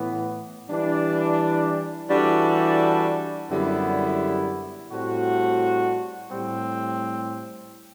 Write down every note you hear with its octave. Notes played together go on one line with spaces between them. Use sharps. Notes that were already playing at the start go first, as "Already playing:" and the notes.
Already playing: A2 E3 B3
E3 G3 D4
E3 G3 D4 F#4 A4
F#2 D3 G3 B3 E4
A2 G3 C4 F#4 A4
A2 G3 C4